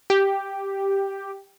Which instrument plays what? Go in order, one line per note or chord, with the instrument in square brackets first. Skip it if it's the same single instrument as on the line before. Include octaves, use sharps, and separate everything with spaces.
[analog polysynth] G4